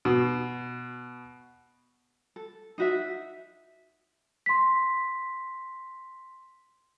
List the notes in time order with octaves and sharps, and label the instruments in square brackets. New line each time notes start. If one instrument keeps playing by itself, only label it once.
[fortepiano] B2
[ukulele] A4
D#4 F#4 E5
[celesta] C6 B6